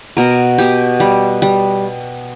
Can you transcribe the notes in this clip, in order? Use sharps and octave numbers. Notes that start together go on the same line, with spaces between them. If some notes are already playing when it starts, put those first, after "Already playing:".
B2 A#4
B2 G4
G3
G3